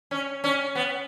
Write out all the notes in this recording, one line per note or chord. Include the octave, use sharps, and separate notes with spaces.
C#4
C#4
B3